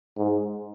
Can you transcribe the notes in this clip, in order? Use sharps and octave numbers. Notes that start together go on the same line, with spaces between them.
G#2